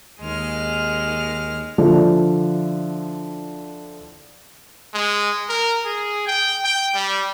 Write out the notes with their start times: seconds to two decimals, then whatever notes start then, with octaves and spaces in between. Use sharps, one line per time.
0.20 D#2 G#3 F6
1.78 D3 F3 D4 E4
4.94 G#3
5.49 A#4
5.85 G#4
6.27 G5
6.64 G5
6.94 G3